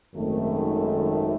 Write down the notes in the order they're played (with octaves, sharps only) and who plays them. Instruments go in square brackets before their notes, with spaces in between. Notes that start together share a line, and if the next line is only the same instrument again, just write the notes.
[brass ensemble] G#1 F#2 D#3 A3